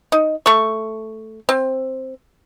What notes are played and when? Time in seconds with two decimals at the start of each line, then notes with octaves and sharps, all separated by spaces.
0.12 D#4
0.46 A3 C#6
1.49 C4